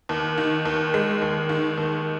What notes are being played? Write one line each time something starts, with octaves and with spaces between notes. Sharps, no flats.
D#2
D#3
D#2
G#3
D#2
D#3
D#2